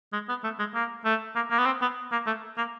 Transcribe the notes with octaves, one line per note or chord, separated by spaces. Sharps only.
G#3
B3
A3
G#3
A#3
A3
A#3
A#3
B3
C4
B3
A#3
A3
A#3